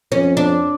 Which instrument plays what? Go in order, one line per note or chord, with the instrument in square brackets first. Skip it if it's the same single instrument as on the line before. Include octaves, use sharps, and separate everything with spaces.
[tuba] F2 [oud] C#4
[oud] D4